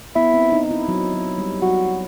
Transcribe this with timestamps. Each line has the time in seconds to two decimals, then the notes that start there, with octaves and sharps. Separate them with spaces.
0.15 B3 E4
0.34 C4
0.52 D#4
0.71 E4
0.88 F#3
1.14 F#3
1.38 G3
1.62 F#3 F#4